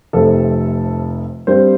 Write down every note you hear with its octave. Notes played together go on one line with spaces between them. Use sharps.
F1 F2 C3 A3 A4
G2 G3 C4 C5